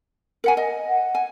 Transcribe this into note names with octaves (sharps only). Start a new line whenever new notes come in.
A#4 F#5 G#5
D#5
F#5
G#5